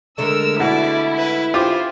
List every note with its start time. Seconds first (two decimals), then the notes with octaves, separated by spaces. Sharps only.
0.18 D3 G#3 A3 A#4 E6
0.60 B2 E4 D5
1.18 B4
1.54 F4 G4 G#4 C5 D6